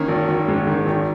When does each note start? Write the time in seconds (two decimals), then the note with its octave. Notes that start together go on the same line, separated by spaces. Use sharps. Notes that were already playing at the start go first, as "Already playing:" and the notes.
Already playing: D#3 A#3 C#4
0.08 G#1
0.28 G#1
0.48 G#2
0.67 D#3
0.86 G#1